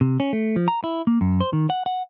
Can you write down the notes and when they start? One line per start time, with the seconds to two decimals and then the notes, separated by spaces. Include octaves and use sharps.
0.01 C3
0.20 C#4
0.33 A3
0.56 F3
0.68 A#5
0.84 E4
1.07 A#3
1.21 F#2
1.41 C5
1.53 D#3
1.70 F#5
1.86 F#5